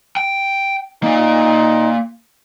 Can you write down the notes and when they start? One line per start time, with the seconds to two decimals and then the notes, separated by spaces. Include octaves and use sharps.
0.17 G5
1.04 A#3 D#4 D5